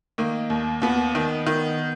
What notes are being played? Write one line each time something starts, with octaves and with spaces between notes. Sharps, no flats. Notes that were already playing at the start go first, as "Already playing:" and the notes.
D#3 A#3
D#2
D#2 B3
D#3
D#3